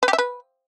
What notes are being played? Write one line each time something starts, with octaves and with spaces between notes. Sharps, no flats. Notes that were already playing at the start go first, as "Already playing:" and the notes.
B4
G4
E5
B4